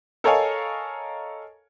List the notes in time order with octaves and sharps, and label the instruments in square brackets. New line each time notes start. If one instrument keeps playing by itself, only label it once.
[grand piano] A4 A#4 C#5 D#5 F5 G#5